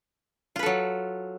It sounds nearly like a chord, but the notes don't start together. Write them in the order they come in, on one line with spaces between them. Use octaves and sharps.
F4 B4 A4 F#3